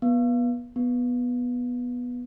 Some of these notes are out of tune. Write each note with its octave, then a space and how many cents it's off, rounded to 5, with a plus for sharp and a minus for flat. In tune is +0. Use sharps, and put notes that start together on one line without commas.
B3 -25
B3 -5